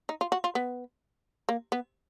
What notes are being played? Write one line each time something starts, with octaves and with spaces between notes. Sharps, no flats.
D#4
F4
F#4
F4
B3
A#3
B3